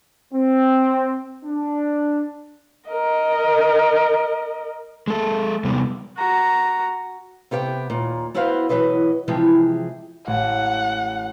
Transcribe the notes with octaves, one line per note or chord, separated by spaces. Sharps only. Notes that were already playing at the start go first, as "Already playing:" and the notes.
C4
D4
A#4 D#5
G#3 A4
C3 G3 B3
F#4 A#5
C3 B3 G4 F5 G5
D#2 A#2
B3 E4 F#4 B4 C5 F5
B2 D#3 E3 F#3 B4 D#5
C3 E3 F3 G#3 G4 G#4
A1 F#5